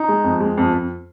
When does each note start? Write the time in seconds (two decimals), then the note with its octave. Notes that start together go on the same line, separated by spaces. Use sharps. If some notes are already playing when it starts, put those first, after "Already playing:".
Already playing: D#4
0.09 G#3
0.24 F2
0.40 G#3
0.57 F2
0.73 F2